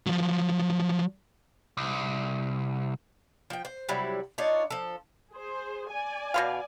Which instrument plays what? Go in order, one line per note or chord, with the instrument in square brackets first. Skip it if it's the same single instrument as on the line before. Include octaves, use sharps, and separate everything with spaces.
[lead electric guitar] F3 F#3
C2
[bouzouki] F3 G5
C5
C3 F#3 G3 E4
D4 D#4 F4 C#5
F3 A4
[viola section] G#4 C5
D5 G#5
[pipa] B2 B3 F5